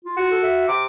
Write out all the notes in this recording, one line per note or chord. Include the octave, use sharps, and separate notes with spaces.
F4
F#4
A4
E5
C3 D6